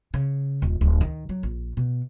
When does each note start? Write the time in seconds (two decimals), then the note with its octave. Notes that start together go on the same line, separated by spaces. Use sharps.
0.14 C#3
0.62 D#1
0.81 D1
1.01 D#3
1.29 F#3
1.43 A#1
1.77 B2